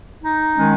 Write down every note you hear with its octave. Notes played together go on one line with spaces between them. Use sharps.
D#4
D#3 G#3 C#4